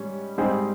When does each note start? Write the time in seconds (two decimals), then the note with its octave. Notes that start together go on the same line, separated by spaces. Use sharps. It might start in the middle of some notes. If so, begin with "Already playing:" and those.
Already playing: G#2 G3 C#4
0.38 G#2 G3 C4 D#4 G#4